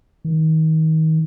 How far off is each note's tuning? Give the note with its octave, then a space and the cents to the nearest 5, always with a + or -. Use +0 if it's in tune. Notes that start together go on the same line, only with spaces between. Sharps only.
D#3 +30